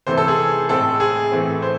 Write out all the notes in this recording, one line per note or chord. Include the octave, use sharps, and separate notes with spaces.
C3 E3 A3 C4 C5
A4
G#4
A2 G#3 C4 A4
G#4
A2 E3 A3 C4
C5